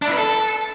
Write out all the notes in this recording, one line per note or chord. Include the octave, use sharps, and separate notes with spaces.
D4
E4
B4
A4